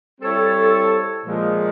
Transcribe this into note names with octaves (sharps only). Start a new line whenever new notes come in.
G3 C4 E4 A4 C#5
A#2 F3 G#3